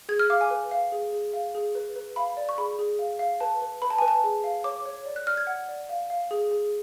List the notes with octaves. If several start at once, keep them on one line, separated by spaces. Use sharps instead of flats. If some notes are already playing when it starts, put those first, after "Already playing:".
G#4 G#6
F6
F5 D6
G#5
B4
F5
G#4
G#4
F5
G#4
B4
B4
F5 B5
D5
C#6
G#4 B5
G#4
F5
F5
B4 A5
B4
B4 B5
A5
B4 G#5
A5
G#4
F5
C#5 D6
C#5
D5
F#6
D5 F6
G#6
F#5
D5
F5
F5
G#4
G#4